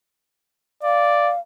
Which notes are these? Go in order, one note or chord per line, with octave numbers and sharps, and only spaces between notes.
D5 F5